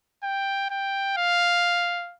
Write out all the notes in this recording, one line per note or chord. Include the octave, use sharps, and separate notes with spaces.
G5
G5
F5